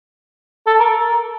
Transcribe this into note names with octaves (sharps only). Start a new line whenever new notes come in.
A4
A#4